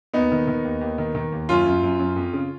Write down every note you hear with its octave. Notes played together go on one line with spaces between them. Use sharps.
D#2 B3 D#4
D#3
D#3
D#2
D#2
D#3
D#3
D#2
F#2 C#4 F4
F#2
F#2
F#2
F2
C#3